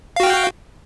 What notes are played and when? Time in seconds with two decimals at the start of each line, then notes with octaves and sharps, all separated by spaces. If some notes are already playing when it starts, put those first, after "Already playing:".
0.16 F5
0.20 F#4
0.23 G5